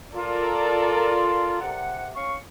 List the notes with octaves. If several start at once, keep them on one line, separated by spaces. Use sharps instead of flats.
F4 A4 A#4 D5
C3 F#5
C#4 F5 C#6